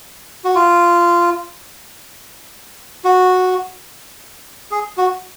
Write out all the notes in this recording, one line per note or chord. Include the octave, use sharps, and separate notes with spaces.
F#4
F4
F#4
G#4
F#4